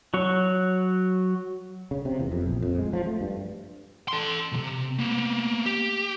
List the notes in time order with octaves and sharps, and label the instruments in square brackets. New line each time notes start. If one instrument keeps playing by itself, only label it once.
[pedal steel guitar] F#3 F#4 C#5
[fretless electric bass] C#3
C3
E2
F2
A#1
F2
G#3
F3
A3
G2
[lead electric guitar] A4 C6
B1 C3
A#3 B3
G4